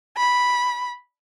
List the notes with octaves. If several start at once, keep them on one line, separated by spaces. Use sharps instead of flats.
B5